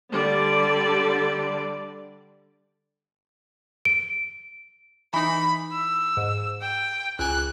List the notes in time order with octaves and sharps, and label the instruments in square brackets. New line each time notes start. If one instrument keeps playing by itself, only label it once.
[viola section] D3 G3 D5
[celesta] D7
[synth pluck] E3 D#4 [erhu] B5
[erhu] E6
[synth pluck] G#2
[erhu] G5
[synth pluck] C#2 G#5 [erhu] F#6